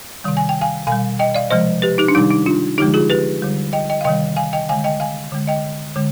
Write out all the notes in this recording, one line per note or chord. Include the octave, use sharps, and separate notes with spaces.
C3 D#3 G3
G#5
G5
F5 G#5
B2 F5 G#5
G3
D#5 G5
D5 F5
C3 F3 G#3 C5 D#5
G4 B4
D#4 G4
D4
C3 D#3 G3 D#4
D#4
D4 F4
D3 F3 G#3 D#4 G4
F4 G#4
G4 B4
D3 G3
D#5 G5
D#5 G5
F5
C3 D#3 G3 D#5 G5
F5 G#5
D#5 G5
D3 G#3 F5 G#5
D#5 G5
F5 G#5
D3 G#3
D#5 G5
D3 G#3